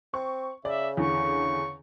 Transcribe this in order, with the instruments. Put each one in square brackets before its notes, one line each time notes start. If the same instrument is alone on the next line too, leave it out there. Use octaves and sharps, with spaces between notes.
[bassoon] C4 [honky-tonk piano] C#6
[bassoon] C#3 [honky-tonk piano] D5 [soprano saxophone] E5
[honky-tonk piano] E2 D3 [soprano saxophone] C#6